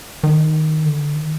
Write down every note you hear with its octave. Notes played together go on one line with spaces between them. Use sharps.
D#3
D3
D#3